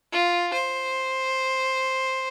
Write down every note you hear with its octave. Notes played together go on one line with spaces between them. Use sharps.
F4
C5